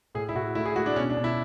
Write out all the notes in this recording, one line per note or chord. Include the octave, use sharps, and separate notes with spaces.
A2 G#4
E4
A2 F#4
A3 E4
G#4
A3 F#4
D4
B2 C#4
D4
B2
E4